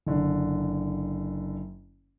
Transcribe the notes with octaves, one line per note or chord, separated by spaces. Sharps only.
F#1 D3